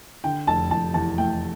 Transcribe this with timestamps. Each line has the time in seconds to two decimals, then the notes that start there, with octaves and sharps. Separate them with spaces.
0.24 D3 G5
0.47 F1 A5
0.71 F1 A5
0.94 E2 A5
1.17 A3 G5